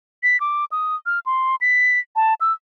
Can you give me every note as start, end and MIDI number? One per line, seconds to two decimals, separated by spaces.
0.23 0.40 95
0.40 0.65 86
0.72 0.96 87
1.06 1.19 89
1.26 1.56 84
1.61 1.99 95
2.16 2.34 81
2.41 2.52 88